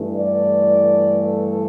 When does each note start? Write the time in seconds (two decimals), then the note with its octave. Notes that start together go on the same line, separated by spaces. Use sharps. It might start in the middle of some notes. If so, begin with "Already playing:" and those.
Already playing: G2 E3 A3
0.16 D5
1.23 A4